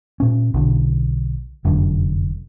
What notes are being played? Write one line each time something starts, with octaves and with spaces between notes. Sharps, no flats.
A#2 C#4
B1 D3
F1 F#2 B2 D3